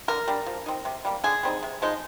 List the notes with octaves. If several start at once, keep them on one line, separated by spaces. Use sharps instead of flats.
D3 A#4
G3 D4
F3
C4 D#4
C3
G3 A#3
D3 G#4
G3 C4 D#4
C3
F3 G#3 D#4